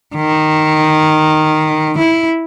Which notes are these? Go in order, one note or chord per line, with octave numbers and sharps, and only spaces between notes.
D#3
E4